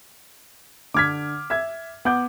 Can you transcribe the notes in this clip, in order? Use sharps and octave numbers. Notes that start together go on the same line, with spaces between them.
D3 D6 F6 G#6 B6
E5 G#6
B3 F#5 D6 G6